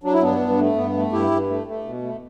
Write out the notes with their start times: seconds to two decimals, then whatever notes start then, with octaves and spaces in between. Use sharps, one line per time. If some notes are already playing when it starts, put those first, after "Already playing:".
0.03 F#3 D4
0.13 E4
0.22 G2 B3 D4
0.40 G2
0.59 A3
0.76 G2 B3
0.95 A3
1.12 G2 E4 G4
1.31 G2
1.49 A3
1.67 A3
1.85 B2
2.03 A3